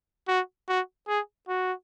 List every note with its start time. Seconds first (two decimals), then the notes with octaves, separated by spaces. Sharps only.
0.28 F#4
0.68 F#4
1.08 G#4
1.48 F#4